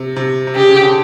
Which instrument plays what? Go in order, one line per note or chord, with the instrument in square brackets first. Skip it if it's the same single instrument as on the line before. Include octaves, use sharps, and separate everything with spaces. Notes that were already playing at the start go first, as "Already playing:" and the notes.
Already playing: [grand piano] C3
C3
C3
[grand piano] C#3 [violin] G4
[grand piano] C#3
D3